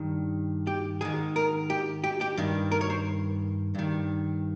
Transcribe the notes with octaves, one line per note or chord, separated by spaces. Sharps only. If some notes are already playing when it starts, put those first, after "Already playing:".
Already playing: G2 D#3
G4
G#2 D#3 G#4
A#4
G4
G4
G4
G2 D#3
A#4
C#5
C5
G2 D#3